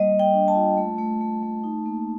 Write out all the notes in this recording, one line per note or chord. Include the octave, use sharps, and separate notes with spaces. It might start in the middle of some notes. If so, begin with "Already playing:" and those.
Already playing: G3 A#3 D#5
G3
G5
D4
A5
F4
A3
A3
A3
A3
D#4
A#3